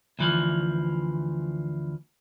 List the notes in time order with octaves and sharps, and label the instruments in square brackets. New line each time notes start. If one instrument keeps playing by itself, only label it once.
[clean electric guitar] D2 E3 F3